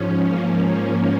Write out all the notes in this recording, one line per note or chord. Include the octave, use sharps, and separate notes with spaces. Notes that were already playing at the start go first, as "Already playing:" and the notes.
Already playing: G#2 F3 C#4
A#3